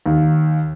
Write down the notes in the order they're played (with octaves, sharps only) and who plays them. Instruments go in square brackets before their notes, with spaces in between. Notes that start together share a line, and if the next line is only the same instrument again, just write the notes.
[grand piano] D#2